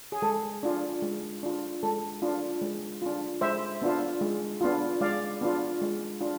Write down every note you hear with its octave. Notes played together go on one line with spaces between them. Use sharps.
G#4
G#3 A4
D4 F4
G#3
D4 F4
G#3 A4
D4 F4
G#3
D4 F4
G#3 C5 E5
B3 D4 F4
G#3
B3 D4 F4
G#3 D5 F5
B3 D4 F4
G#3
D4 F4